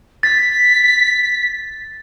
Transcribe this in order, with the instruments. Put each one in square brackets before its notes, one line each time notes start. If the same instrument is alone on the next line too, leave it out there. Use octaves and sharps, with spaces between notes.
[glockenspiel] A6 [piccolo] B6